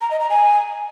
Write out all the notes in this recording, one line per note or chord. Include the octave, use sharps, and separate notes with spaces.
A#5
D#5
A#5
G#5